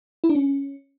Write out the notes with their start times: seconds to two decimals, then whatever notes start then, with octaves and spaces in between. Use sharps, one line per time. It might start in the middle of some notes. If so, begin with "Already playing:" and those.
0.24 E4
0.29 D4
0.35 C#4